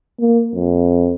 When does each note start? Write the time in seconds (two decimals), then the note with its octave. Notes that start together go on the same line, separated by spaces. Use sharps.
0.20 A#3
0.55 F2